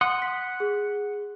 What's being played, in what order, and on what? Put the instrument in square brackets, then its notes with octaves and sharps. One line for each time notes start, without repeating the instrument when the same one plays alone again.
[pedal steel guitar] F#5 C6 D#6
[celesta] B6
G#4